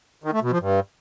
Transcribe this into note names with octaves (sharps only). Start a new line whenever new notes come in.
D#3
A3
B2
F3
G2